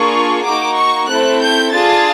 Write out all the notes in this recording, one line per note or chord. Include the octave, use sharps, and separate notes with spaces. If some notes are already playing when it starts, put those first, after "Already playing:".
Already playing: A#3 D4 F4 G#4 C#6
A#3 D#4 F#4 D6
C#6
A3 C4 E4 A4 F#6
G6
D4 F4 G#4 A6